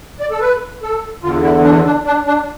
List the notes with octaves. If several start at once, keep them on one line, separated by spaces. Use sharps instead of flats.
D5
A4
B4
A4
E2 D3 F4
E4
D4
D4
D4
D4